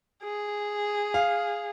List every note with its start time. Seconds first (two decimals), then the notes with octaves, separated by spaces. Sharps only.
0.23 G#4
1.14 F5